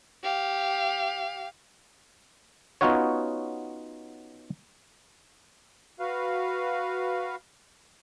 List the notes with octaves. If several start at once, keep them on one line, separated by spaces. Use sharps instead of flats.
G4 F5
B3 C#4 D#4 F4 F#4 C#5
F#4 B4 F5